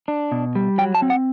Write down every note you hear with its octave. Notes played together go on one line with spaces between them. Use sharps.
D4
B2
G3
F#3 G5
A5
C4
F#5